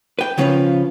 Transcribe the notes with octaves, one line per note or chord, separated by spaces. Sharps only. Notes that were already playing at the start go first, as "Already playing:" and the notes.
B4 G5
C#3 F3 C#4 F4 B4